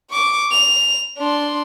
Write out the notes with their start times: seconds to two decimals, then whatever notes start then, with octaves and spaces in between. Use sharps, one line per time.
0.10 C#6 D6
0.52 F7
1.18 D4 C6